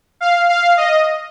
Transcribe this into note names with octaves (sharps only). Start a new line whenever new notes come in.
F5
F5
D#5